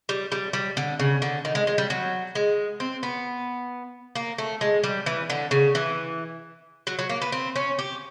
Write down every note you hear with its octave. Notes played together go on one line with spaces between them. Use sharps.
G3
G3
G3
D3
C#3
D3
D#3
G#3
G#3
G3
F#3
G#3
C4
B3
A#3
A3
G#3
G3
E3
D3
C#3
E3
F#3
F#3
A#3
B3
C4
C#4
G4